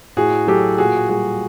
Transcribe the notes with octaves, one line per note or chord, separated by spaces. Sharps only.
A2 F#4 G#4
F#3 G4 A4
A#2 F#4 G#4
G3 F#4 G#4